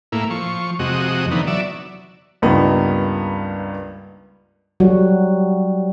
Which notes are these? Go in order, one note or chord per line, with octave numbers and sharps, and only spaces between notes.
A2 A#3 E4
F3 C#6
F2 C3 G#3 F#4 D#5
D3 E3 B3 D#4
F#3 D5 E5
C#2 G2 A#3 B3 D#4
F#3 G3 F#4